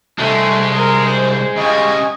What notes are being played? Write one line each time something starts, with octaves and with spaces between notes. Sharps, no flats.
C2 G#3 A3 D4
G#4 A#4
C5
C#3 G3 D#5 G#5 C#6